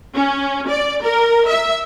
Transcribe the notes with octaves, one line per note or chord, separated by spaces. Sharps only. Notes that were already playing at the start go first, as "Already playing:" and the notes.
C#4
D5
A#4
E5